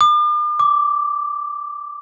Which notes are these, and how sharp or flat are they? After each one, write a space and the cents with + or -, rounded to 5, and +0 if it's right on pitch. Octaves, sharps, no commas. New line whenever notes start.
D6 +45
D6 -10